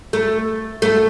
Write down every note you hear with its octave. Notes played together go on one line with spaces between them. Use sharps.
A3
A3